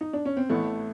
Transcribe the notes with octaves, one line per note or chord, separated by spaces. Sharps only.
D#4
D4
C#4
C4
A1 A2 E3 A3 B3